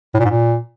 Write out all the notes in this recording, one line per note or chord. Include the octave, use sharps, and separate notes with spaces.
A2
A#2
G#2
A#2